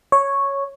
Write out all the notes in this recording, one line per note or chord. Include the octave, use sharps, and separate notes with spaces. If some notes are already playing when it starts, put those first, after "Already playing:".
C#5